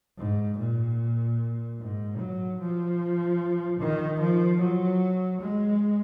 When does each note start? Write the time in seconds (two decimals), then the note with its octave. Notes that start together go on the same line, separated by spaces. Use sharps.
0.17 G#2
0.58 A#2
1.79 G#2
2.19 F#3
2.60 F3
3.80 D#3
4.20 F3
4.61 F#3
5.41 G#3